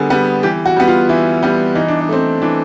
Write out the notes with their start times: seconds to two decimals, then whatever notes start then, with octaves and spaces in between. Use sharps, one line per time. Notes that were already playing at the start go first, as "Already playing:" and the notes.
Already playing: D3 G3 B3 G#4
0.10 G3 B3
0.43 E3 G4
0.66 F#4
0.76 G3 B3
0.88 F4
1.09 E3 E4
1.43 G3 B3
1.75 E3 D#4
1.88 D4
2.01 D#4
2.09 A3 C4
2.42 E3 D4